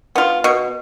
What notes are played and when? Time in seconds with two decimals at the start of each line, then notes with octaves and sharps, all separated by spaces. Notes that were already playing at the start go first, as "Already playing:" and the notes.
0.15 B3 F4
0.44 B2